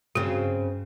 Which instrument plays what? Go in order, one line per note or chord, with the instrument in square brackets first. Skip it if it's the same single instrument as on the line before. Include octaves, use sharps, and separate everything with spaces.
[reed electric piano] G2 [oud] C#3 C4 [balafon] F#4